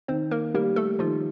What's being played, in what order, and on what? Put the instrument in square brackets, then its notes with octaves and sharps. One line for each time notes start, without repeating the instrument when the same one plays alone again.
[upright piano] D#3 [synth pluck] C4 C5
[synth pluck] A#3 A#4
[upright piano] G3 [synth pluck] A#3 A#4
[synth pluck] A3 A4
[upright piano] D#3 [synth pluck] F3 F4